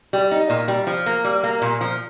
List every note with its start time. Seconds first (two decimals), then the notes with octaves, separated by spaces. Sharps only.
0.13 G3
0.31 D#4
0.50 A#2
0.68 G3
0.87 F3
1.06 A#3
1.24 G3
1.44 A#3
1.62 A#2
1.81 F3